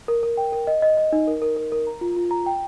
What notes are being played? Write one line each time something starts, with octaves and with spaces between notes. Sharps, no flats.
A#4
A#4
G5
A#4
D#5
D#5
D#5
D#4
A#4
A#4
A#4
A#4
A#5
F4
F4
A#5
G5